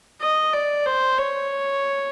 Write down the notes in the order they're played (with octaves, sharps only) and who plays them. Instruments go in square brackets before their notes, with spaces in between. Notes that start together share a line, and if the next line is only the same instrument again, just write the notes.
[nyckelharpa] D#5
D5
C5
C#5